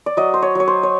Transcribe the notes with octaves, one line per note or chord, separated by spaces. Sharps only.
D5
F#3 D#5
C5
C#5
F#3 C#5
C5
C#5